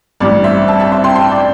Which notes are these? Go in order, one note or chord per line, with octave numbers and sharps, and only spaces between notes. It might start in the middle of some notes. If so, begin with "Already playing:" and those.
A1 G2 G3 D5
C5 E5
E5 A5
E5 A5
C5 E5
G5 C6
G5 C6
D5